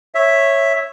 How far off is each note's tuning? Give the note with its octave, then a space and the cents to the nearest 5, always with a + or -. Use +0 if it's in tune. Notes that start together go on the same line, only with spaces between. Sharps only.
C#5 -10 E5 +0